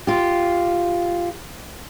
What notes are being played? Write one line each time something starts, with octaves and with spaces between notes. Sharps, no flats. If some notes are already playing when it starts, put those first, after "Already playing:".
F4 G4